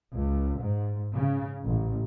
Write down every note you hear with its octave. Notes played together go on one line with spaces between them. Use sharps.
C#2
G#2
C#3
A1